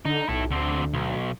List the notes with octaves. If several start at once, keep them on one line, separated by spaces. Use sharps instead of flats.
D3 D#4
B1 E4 A4
D2 D3 C4
B1